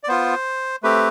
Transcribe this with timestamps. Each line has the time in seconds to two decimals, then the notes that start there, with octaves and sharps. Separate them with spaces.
0.04 D5
0.08 B3 F4 C5
0.83 A3 C4 G4 B4